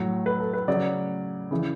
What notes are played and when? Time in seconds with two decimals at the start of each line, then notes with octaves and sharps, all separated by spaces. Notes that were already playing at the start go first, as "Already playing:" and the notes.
Already playing: A2 F#3
0.26 B4
0.40 A4
0.53 B4
0.68 C#3 F#3 D5
1.51 C#3 E3